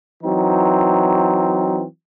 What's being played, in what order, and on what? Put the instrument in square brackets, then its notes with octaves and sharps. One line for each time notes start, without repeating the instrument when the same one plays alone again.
[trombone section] E3 F#3 C4 D#4